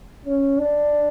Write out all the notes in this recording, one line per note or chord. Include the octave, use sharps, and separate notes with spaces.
C#4
D4